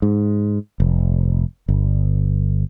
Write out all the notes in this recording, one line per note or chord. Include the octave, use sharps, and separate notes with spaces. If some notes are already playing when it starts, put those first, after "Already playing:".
G#2
F1
G1